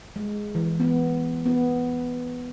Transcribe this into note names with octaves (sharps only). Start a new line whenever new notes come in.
G#3
E3
B3
B3